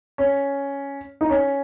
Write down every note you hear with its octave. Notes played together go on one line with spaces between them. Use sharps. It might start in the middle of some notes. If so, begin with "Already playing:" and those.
C#4
D#4
C#4